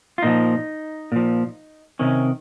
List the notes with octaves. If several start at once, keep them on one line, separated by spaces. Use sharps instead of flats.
F4
A#2 F3 D#4
A#2 F3
C3 D#3 C#4